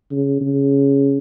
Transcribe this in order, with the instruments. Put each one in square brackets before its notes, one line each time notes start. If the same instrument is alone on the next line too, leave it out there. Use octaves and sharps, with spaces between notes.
[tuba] C#3
C#3